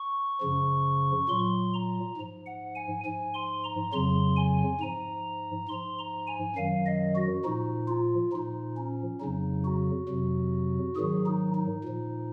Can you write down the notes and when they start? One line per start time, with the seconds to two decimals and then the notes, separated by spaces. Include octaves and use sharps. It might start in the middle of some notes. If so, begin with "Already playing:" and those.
Already playing: C#6
0.41 F#2 C#3 F3
1.29 A#2 F#3 C6
1.73 A#5
2.17 G#2 F3
2.46 F#5
2.75 G#5
3.05 G#2 F3 G#5
3.34 C6
3.64 A#5
3.92 F2 C#3 F#3 C6
4.36 G#5
4.80 G#2 F3 A#5
5.68 G#2 F3 C6
5.98 A#5
6.27 G#5
6.56 F#2 D#3 F#3 F5
6.86 D#5
7.15 F#4
7.44 A#2 F3 D#4
7.88 F4
8.32 A#2 F3 D#4
8.76 C#4
9.20 F2 C#3 F#3 D#4
9.64 F#4
10.08 F2 C3 F#3
10.96 G#2 D#3 F#3 G#4
11.26 D#4
11.55 D#4
11.84 A#2 F3